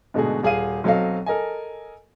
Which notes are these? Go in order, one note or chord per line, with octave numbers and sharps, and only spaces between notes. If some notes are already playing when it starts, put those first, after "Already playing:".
G#2 B2 D3 A3 F#4 G#4
D#1 G#4 F5 D#7
B1 F#3 C4 A4 D#5 F5
A4 A#4 D#5 G#5